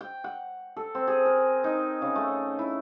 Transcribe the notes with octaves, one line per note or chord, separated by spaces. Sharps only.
G5
F#5
A4
C4
G#4
A#4
D#4
C#3
A3
E4